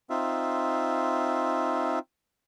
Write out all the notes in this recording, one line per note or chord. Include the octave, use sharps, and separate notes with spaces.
C4 D#4 F4 E5